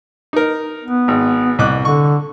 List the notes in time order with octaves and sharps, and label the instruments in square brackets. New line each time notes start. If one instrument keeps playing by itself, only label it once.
[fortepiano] D#4 A#4
[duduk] B3
[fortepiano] G#1
C2 D6 F#6
[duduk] D3 [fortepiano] C#6